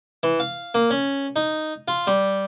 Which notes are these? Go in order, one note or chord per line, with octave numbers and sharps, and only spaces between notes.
E3
F5
A#3
C#4
D#4
F4
G3